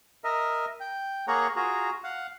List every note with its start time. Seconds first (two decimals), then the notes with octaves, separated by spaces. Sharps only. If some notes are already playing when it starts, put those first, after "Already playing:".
0.24 A#4 D#5 E5
0.80 G5
1.28 A#3 G#4 C#5 F#5 A#5
1.56 F4 F#4 G#4 A#5
2.04 F5 F#5